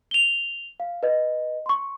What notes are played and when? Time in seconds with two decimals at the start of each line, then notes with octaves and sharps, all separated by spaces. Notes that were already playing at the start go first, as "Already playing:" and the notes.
0.11 F7 G7
0.80 F5
1.03 B4 D#5
1.66 C6 C#6